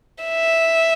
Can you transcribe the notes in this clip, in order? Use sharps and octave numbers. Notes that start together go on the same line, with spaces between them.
E5